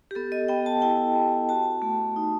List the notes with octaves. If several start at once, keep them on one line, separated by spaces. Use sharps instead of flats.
G4
B3 A4
D#5
B3 G5
A5
E4 G5
B3
F#4 A5
A3
D#4